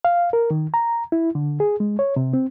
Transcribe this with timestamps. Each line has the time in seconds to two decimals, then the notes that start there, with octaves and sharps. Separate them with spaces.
0.05 F5
0.33 A#4
0.51 D#3
0.74 A#5
1.12 E4
1.35 D3
1.60 G#4
1.80 G#3
1.99 C#5
2.16 C3
2.34 C4